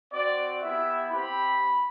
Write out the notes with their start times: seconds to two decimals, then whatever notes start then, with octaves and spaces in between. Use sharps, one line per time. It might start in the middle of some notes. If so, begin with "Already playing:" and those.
0.13 C4 F#4 D5
0.62 B3 E4 G4 E5
1.11 C4 G4 B5